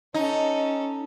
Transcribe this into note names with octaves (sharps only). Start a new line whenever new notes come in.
C#4 D#4 A4